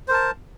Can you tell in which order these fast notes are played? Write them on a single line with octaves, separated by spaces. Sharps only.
C5 A#4 A5